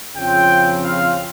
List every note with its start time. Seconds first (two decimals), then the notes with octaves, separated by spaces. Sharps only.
0.16 F2 C#3 F3 C4 G5
0.83 F5